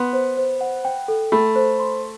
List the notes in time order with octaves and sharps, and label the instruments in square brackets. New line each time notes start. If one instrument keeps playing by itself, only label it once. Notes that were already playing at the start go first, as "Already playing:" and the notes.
Already playing: [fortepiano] B3 [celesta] C6
[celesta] C5
C5
F#5
G5
A4
[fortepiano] A3 [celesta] B5
[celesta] C5
C6